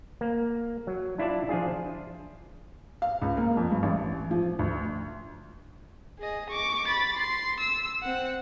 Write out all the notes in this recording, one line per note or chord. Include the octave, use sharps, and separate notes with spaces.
A#3
F#3
D4 E4 F4 D5 A5
F3 D4 F4 G#4
F5
C#2
A#3
F2
G2
A1
F3
D2
G#4 D#5
C#6 D6
B5 A6
C6
E6
C4 F#5